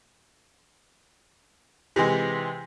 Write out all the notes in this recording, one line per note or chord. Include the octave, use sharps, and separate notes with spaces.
C3 E3 G#3